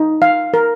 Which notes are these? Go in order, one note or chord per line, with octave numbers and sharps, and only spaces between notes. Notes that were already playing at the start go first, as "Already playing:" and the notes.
Already playing: D#4
F5
A#4